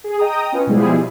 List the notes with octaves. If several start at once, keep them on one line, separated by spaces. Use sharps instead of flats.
G#4
D#5 G5 A#5 D#6
C#4 F4 B4
B2 F3 G3 G#3 E4 G#4